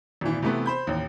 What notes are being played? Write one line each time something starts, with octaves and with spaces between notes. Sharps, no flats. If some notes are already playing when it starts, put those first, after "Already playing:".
G#1 A#2 E3
C3 E3 A3 B3
C5 B5 G6
A1 D#2